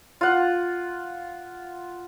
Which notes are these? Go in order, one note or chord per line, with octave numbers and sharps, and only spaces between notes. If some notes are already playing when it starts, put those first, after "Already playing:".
F4 F#5